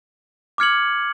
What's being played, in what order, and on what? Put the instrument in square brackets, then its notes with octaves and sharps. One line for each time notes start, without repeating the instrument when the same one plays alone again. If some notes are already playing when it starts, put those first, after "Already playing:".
[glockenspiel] D6 F6 G#6 C#7 F#7